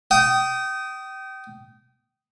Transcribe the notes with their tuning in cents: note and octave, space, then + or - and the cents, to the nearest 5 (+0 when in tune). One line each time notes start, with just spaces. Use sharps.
G5 -30 D#6 +0